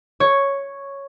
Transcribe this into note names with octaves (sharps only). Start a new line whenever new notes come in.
C#5